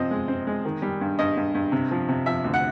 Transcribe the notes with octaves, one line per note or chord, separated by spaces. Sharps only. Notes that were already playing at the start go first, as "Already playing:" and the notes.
Already playing: C3 F3 C4 D#5
G#3
C4
G#3
D#3
G3
G2
G2 D#5
G2
G2
C3
F3
C3
F3 E5
D2
F#5